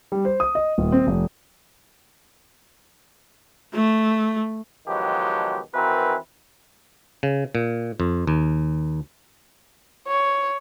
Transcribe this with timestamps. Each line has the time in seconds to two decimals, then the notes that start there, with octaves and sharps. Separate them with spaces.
0.12 G3
0.25 C5
0.40 D#6
0.55 D#5
0.78 D#1
0.92 C4
1.07 F1
3.74 A3
4.87 B2 D#3 F3 F#3 G#3 G4
5.74 D#3 E3 C4 F#4 A#4 B4
7.23 C#3
7.55 A#2
8.00 F2
8.27 D#2
10.07 C#5